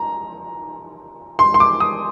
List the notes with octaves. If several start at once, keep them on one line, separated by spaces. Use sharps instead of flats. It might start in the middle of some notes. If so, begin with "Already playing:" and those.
Already playing: A#5
C6
C6
D6
D#6